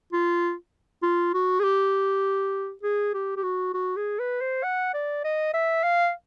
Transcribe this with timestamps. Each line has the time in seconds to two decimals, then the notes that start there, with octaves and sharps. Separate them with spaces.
0.13 F4
1.03 F4
1.34 F#4
1.60 G#4
1.64 G4
2.83 G#4
3.14 G4
3.37 G4
3.43 F#4
3.74 F#4
3.97 G#4
4.19 B4
4.41 C5
4.64 F#5
4.94 D5
5.25 D#5
5.54 E5
5.83 F5